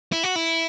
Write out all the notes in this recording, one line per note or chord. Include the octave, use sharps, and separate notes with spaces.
E4
F#4
E4